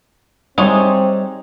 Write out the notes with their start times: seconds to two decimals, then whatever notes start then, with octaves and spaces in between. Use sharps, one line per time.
0.58 G3 G#3 C4 D#4 C#5 E5 G#5